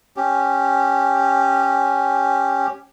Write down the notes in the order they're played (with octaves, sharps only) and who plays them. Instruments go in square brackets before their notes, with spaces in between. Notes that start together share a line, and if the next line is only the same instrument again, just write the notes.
[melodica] C#4 G4